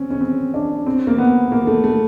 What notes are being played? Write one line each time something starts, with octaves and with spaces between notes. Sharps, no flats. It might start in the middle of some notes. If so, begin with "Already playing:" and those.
Already playing: C4 C#4
C#4
C4
D4
C4
A#3
B3
A#3
A3
A3